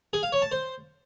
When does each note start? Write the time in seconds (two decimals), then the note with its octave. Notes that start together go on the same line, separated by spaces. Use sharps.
0.13 G#4
0.23 F5
0.32 C#5
0.42 A5
0.52 C5